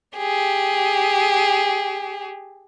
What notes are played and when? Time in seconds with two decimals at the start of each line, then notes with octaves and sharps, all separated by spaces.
0.18 G4 G#4